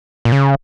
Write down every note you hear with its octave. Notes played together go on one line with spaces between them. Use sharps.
A#2
C#3